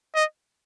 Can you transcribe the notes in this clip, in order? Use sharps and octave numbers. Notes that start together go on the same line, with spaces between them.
D#5